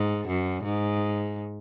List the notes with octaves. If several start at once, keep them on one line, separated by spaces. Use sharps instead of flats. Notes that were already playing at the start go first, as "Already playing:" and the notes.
Already playing: G#2
F#2
G#2